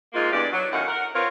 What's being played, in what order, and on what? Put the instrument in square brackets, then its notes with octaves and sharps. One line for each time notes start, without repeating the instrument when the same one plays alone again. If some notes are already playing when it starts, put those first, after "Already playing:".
[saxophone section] G#2 G#3 A#3 F4
E2 G2 D5
F#3
F#2 A2 D#3 F5 F#5
A#4 F#5
C4 F4 A#4 B4 C#5